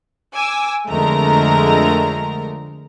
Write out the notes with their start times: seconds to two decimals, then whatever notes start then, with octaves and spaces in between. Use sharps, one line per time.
0.35 G#5 D6 E6
0.89 F2 D3 G#3 A3 A#4 A#5